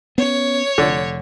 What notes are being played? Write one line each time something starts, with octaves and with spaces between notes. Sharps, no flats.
B3 C#4 C#5
F1 D3